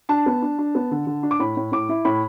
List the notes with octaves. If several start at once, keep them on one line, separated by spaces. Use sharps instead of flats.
D4 A5
B3
D4
D4
B3
D3
D3
D4
D6
A2 B5
A2
A2 D6
E4
A2 B5